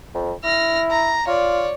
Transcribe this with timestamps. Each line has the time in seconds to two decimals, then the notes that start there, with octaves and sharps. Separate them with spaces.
0.15 F2
0.44 E4 F6 A#6
0.90 A#5
1.27 F4 C#5 D5